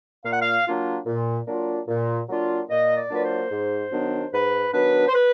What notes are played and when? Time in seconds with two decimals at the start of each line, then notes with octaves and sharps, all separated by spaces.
0.24 A#2 F5
0.33 F#5
0.41 F5
0.66 F#3 A#3 D4 F4
1.06 A#2
1.47 F#3 A#3 D4 F4
1.88 A#2
2.29 F#3 A#3 D4 F4
2.69 A#2 D#5
2.96 D5
3.10 F#3 A#3 D4 F4 B4
3.23 C5
3.50 G#2
3.91 D#3 F#3 B3 D4
4.32 G#2 B4
4.73 D#3 F#3 B3 D4 B4
5.07 C5
5.13 B4